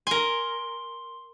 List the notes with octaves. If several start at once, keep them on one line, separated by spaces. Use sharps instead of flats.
A#4 G#5 C6